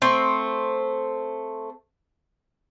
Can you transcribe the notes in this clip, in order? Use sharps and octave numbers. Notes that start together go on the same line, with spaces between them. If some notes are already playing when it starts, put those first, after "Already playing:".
A3 C4